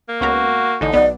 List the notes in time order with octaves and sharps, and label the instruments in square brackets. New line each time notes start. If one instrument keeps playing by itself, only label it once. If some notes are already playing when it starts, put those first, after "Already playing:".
[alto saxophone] A#3
[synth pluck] C#2 B3 A#4 [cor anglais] F#4
[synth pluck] A1 D3 [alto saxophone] D#4
[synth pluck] B1 B3 [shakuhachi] D5